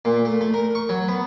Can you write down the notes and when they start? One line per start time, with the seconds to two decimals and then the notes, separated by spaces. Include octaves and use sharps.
0.05 A#2
0.25 A3
0.41 A3
0.54 A#4
0.75 C#6
0.89 F#3
1.08 B3